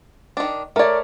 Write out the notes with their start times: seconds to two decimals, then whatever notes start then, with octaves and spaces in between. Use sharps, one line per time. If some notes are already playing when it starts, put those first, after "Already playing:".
0.37 D#3 D4
0.76 A3 A#4 C#5 D5